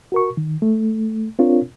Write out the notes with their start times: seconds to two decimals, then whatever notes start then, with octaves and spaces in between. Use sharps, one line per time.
0.12 F#4 A#4 C#6
0.37 D#3
0.62 A3
1.39 C4 D4 F4 A#4 C#5